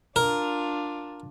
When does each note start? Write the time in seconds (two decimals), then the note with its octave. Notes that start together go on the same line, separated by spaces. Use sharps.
0.16 D4 F4 A#4